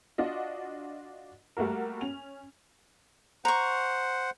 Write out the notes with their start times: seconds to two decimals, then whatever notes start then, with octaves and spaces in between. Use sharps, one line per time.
0.18 D4 F4 F#4 D#5
1.57 G3 A3 A#3 F#4 A#4
2.01 C#4 F7
3.45 C5 F#5 A#5 C#6